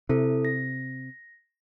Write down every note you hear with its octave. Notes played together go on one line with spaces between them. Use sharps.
C3 E4 A4
A#6